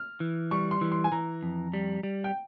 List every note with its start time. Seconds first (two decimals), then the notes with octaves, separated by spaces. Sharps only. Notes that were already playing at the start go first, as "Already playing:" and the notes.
Already playing: F6
0.20 E3
0.51 G3 C#6
0.71 C6
0.81 E3
0.92 C6
1.04 G#5
1.12 E3 A#5
1.43 F2
1.74 G3
2.03 G3
2.24 G5